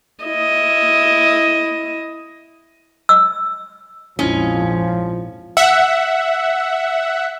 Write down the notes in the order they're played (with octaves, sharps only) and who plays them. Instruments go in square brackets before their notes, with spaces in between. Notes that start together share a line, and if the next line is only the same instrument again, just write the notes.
[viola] E4 D#5
[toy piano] E6
[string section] A#1 F2 G#2 [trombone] F3 [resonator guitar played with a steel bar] C#4 [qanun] E4 F4 D#5
[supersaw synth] E5 F#5